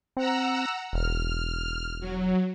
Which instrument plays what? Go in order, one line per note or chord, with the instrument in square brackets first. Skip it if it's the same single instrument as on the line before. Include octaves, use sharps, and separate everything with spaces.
[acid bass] C4 [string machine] F#5 A#5 E6
[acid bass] E1 [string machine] F6
[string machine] F#3